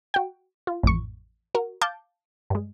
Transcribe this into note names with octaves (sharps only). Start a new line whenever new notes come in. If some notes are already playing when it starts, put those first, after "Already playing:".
F#4 G5
F4
A1 F2 C#6
F#4 A#4
F5 A5 D6 G6
G2 G#3